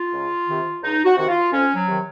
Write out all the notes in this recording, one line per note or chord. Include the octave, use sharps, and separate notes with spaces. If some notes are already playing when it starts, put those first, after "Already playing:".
Already playing: F4
C#2
C3 D#3
C#2 D#4
F#4
C3 D#3 F#4
F4
F2 C#4
F#3
C3 D#3